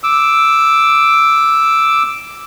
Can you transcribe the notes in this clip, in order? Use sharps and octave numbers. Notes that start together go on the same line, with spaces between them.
D6 E6